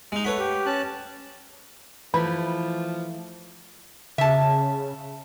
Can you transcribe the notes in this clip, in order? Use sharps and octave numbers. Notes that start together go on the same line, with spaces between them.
G#3 D#4
A3 B4 C#5 F#5 B5
G4
C#4 A5 F#6
E3 F3 A3 B4 B5
C#3 E5 A5